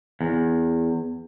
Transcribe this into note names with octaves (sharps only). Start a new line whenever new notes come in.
E2